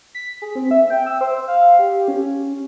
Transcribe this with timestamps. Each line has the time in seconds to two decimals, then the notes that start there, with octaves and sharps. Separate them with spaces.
0.15 B6
0.42 G#4
0.55 C4
0.71 E5
0.90 G5
1.06 E6
1.21 C5
1.48 F5
1.79 G4
2.08 C#4